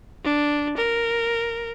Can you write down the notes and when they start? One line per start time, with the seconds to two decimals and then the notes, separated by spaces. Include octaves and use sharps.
0.25 D4
0.77 A#4